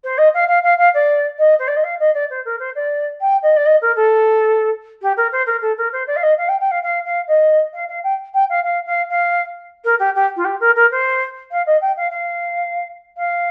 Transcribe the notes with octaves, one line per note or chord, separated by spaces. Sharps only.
C5
D#5
F5
F5
F5
F5
D5
D#5
C5
D5
D#5
F5
D#5
D5
C5
A#4
C5
D5
G5
D#5
D5
D#5
A#4
A4
G4
A#4
C5
A#4
A4
A#4
C5
D5
F5
D#5
F5
G5
G5
F5
F5
F5
D#5
F5
F5
G5
G5
F5
F5
F5
F5
A#4
G4
G4
F4
G4
A#4
A#4
C5
F5
D#5
G5
F5
F5
F5